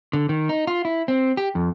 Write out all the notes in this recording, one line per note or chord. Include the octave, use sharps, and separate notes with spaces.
D3
D#3
D#4
F4
E4
C4
G4
F2